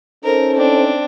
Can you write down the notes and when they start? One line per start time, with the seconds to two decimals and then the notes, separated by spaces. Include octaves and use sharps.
0.25 C#4 D#4 A4 A#4 C5
0.54 C4 D4